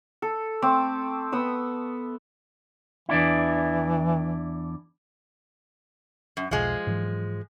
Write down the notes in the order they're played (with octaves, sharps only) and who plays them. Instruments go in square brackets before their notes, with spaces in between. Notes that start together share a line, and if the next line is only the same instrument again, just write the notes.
[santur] A4
A3 C4 D6
B3 D#6 E6
[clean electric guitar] E2 D4 E4 [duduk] E3
[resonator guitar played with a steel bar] F#2
[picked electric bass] E1 B1 [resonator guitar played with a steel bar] F3 G#3
[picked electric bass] G#2 E3 F#3